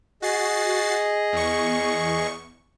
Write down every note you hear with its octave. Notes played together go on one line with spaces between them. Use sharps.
F#4 G#4 D#5 A6 C7
E2 C#6